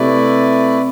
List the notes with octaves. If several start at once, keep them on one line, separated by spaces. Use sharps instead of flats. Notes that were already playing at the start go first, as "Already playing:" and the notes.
Already playing: C3 A3 E4 B4 D5